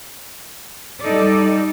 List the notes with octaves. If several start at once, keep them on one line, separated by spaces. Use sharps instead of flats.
G3 D#4 A4 D5